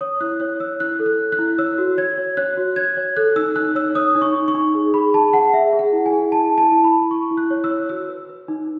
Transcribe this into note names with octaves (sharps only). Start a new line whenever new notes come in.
C#5 D#6
E4 F#6
C#5 F#6
C#5 E6
E4 F#6
A4
F#6
A4
F#6
E4
C#5 E6
F#4
C#5 G#6
C#5
C#5 F#6
F#4
C#5 G#6
C#5
A4 F#6
D#4 E6
D#4 F#6
C#5 E6
C#5 D#6
D#4
C#6
D#4
C#6
D#4
G#4
G#4 B5
G#4 A5
G#4 F#5
G#4 E5
G#4
F#5
E4
G#5
G#4
E4 A5
E4
A5
E4
B5
E4
E4 C#6
E4
F#6
C#5
E6
C#5
F#4 E6
B4
B4
D#4